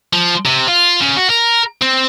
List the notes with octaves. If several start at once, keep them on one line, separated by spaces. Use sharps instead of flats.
F3
C3
F4
C#3
F#4
A#4
C4